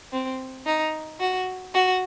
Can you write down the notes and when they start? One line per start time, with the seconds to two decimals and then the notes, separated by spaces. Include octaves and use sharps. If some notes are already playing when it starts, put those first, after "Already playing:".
0.13 C4
0.66 D#4
1.21 F#4
1.74 F#4